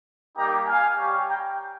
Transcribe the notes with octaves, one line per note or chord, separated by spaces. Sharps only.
G3 A#3 D#4 G4 G5 A#5
F5 G#5
G3 C#4 G4
G5 A#5